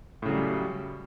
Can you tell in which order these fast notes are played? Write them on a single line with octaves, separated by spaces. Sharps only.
A2 C#3 F#3 G3